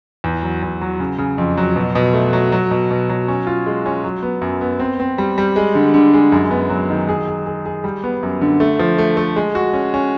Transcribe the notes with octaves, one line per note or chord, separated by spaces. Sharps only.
E2
F#3
E2
F#3
C#3
C#3
F2
F#3
B2
B2
A3
F#3
F#3
B2
B2
F#3
C#4
F4
G#3
C#4
F#3
B3
F#2
B3
C4
C4
G3
G3
G#3
D3
D3
G#3
F#2
B3
F#3
D#3
G#4
G#4
G#4
G#4
G3
B3
F#2
D3
A3
F3
A3
A3
G#3
F#4
C#4
C#4